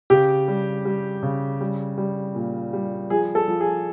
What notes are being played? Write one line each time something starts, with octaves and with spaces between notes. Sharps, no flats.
C#3 G4
G3
G3
C#3
G3
G3
A#2
G3
F3 G#4
A4
F3
G#4